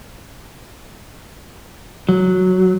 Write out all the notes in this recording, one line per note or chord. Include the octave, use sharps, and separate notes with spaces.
F#3